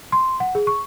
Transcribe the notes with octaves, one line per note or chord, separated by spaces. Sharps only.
C6
F#5
G#4
C#6